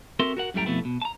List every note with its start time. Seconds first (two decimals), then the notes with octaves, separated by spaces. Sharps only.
0.19 C4 F#4 A4 A#4 E5 C6
0.37 F#4 A#4 F#5
0.54 F#2 A2 G3 A3 G5 A#5
0.66 F2 B2 A3 B3 E4
0.85 B2
1.02 A5 A#5